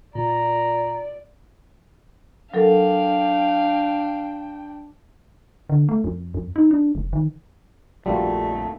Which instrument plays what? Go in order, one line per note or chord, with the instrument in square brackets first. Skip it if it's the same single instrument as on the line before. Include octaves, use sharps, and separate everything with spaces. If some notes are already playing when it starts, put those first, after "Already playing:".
[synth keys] A#2 [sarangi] D5 [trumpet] A#5
[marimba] F#3 A4 A#4 [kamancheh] D4 G5 [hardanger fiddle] F5
[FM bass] D3
A3
F2
F2
D#4
D4
F1
D#3
[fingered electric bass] A#1 F2 [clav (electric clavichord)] G3 [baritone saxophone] A3 [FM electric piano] A#3 F4 F#4